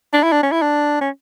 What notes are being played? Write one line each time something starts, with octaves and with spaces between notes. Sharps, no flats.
D4
E4
D4
C#4
E4
D4
C#4